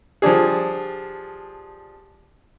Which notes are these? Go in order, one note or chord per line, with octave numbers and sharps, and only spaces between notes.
F3 G3 D4 G#4